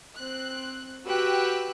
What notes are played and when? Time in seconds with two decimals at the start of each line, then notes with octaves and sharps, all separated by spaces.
0.14 C4 F#6
1.06 F#4 G4 B4 G5 E6 F#6